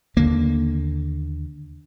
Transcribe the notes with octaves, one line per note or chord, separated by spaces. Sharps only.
D#2 D3 A#3